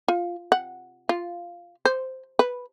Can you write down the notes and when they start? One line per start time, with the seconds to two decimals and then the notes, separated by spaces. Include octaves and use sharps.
0.08 F4
0.52 F#5
1.09 F4
1.85 C5
2.39 B4